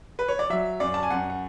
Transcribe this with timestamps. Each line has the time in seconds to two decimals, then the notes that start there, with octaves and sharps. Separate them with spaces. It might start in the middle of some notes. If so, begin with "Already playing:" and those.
0.19 B4
0.28 C#5
0.39 D5
0.50 F#3 E5
0.80 F#2 D5
0.94 A5
1.03 G#5
1.10 F#2 F#5
1.30 F#5